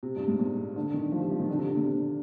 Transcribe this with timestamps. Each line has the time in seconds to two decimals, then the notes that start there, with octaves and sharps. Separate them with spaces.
0.03 C3
0.16 G2
0.28 G#2
0.39 A#2
0.76 D3
0.94 D#3
1.12 F3
1.22 G3
1.31 F3
1.40 D#3
1.49 D3
1.58 C3
1.67 D3
1.77 A#2
1.85 C3